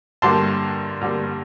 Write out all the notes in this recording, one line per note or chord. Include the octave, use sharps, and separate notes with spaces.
G2 D3 G3 A#3 A5 C6
G2 D3 G3 A#3